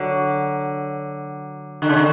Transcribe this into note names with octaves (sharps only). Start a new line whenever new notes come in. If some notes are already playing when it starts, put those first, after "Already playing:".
Already playing: D3 F#3
D3
C#3
D3